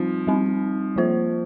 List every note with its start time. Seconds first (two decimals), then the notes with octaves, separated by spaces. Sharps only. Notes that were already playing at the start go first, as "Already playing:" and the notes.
Already playing: F3 G3 C4 D#4
0.27 G3 C4 D#4
0.96 F3 A#3 F4 C5